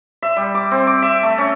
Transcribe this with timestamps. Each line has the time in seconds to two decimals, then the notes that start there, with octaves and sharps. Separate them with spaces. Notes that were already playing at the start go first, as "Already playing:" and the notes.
0.23 E5
0.36 G3
0.55 D6
0.71 C4
0.87 D6
1.02 E5
1.23 A3
1.38 C#4